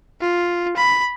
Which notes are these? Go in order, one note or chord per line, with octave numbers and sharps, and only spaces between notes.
F4
B5